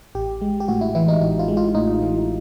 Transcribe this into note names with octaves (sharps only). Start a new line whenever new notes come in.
A1 G4
G#3
G4
A2 F#4
E4
E3 E4
D#4
A1 E4
F4
G#3
F4
A2 D#4
E3